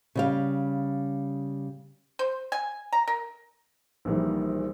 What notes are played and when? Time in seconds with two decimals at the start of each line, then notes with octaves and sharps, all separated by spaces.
0.15 C#3 G3 F5
2.19 C5
2.52 G#5
2.93 A#5
3.08 A#4
4.05 A#1 A#2 D#3 E3 G3